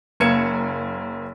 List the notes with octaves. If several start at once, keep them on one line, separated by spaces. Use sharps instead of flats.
F#1 A#3 G#6 C#7 E7